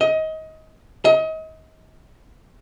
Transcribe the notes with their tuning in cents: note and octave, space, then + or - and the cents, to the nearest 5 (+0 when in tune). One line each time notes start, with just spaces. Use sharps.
D#5 +25
D#5 +35